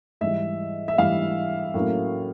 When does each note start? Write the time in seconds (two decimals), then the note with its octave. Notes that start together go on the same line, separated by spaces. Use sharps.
0.21 G#2 E3 G3 E5
0.88 E5
0.98 G#2 E3 G3 F5
1.74 A2 F#3 A#3 C#4